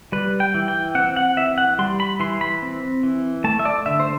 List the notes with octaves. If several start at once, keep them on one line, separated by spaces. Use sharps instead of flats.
G3 B4
G5
E3
G5
C4 F#5
F#5
E3 E5
F#5
G3 C6
B5
E3 C6
B5
C4
E3
A3 A5
E5
D5
D3 E5
C5